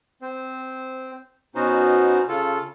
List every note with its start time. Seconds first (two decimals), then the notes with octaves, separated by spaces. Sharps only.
0.22 C4 C5
1.55 B2 B3 C#4 D#4 F#4 C5
2.28 C#3 F4 A4